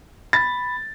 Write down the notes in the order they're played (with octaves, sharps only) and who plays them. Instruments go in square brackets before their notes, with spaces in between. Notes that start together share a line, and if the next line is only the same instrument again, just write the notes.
[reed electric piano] B5 [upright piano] A6